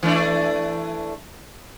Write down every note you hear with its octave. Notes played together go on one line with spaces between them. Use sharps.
E3 A3 D4